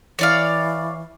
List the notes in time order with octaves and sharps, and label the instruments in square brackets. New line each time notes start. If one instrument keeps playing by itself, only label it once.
[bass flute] E3 [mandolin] C#5 D5 F5